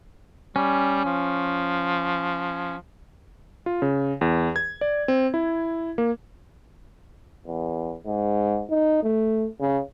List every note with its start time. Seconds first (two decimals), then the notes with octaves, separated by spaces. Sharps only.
0.56 G3 C#4
1.05 F3
3.66 F4
3.82 C#3
4.21 E2
4.56 G#6
4.81 D5
5.08 C4
5.34 E4
5.98 A#3
7.47 E2
8.06 G#2
8.70 D#4
9.03 A3
9.61 C#3